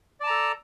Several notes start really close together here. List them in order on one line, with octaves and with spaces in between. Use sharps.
D5 A5 A#5 A4